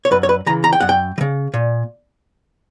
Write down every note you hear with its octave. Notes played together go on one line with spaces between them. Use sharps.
C#5
F#2 B4
C#5
B4
C#3 E3 A#5
A#5
G5
F#2 F#5
G5
E3
C#3
A#2